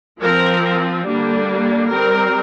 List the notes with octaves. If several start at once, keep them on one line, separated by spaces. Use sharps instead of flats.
F3 C4 A#4
D3 G3 A#3 D4
G3 C4 A#4